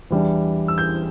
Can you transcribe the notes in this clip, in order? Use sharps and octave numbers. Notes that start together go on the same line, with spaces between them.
E2 E3 G3 D4
E6
G6